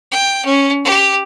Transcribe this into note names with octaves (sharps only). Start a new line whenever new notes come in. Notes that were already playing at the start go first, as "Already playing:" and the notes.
G5
C#4
G4